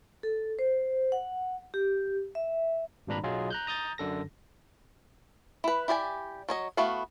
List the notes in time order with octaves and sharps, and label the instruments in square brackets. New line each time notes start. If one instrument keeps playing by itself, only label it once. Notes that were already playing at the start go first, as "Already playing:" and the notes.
[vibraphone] A4
C5
F#5
G4
E5
[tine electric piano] G#1 G2 A#2 D4 A#5 B5
B1 F#3 F4 G#4 D#5
A#5 F#6 G6
A#5 D#6 G6 A6
F#2 D3 A4 A#6
[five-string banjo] E4 B4
E4 G4 D5 G#5
F#3 C#5 D#5
A3 B3 E4 F#4 F5